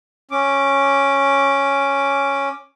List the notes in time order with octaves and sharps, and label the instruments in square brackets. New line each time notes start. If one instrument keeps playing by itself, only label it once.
[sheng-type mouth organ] C#4 D6